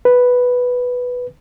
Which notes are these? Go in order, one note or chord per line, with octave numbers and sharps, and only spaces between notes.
B4